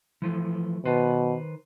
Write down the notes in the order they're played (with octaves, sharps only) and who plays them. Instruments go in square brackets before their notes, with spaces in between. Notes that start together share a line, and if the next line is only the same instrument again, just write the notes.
[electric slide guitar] E3 F3 A3
[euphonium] B2 [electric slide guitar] D#3 B4 C5